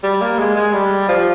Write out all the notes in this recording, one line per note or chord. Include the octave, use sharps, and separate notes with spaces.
G3
A#3
G#3
G#3
G3
F3